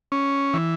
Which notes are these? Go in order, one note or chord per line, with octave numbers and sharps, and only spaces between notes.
C#4
E3